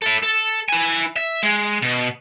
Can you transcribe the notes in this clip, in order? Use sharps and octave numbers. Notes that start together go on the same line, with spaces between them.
E4 A4
A4
E4 G#5
E5
G#3
B2